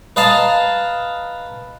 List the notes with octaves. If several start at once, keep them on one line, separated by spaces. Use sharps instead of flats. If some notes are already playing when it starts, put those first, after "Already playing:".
B4 D#5 F5 A5 A#5